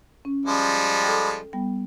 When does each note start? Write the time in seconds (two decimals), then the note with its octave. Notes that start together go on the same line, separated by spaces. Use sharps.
0.25 C#4
0.46 F3 G3 G#3
1.03 A4 G5
1.53 G3 B3 G5